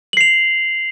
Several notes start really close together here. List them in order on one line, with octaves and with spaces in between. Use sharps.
F#7 C7 F7